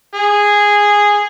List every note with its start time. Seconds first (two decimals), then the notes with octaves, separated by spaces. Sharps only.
0.15 G#4